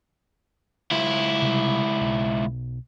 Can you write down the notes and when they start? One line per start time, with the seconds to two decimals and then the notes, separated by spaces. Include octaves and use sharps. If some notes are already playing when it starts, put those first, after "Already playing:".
0.91 C#2 E4
1.42 C3 G3
2.01 B1